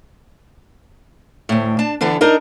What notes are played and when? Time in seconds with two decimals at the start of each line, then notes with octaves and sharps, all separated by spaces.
1.49 D2 A2
1.79 D4 A5
2.01 D3 E3 B3 D4
2.21 D4 D#4 A#4 D#5